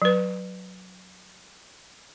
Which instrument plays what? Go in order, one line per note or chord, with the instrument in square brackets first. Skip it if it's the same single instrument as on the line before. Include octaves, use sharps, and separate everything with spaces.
[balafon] F#3 B4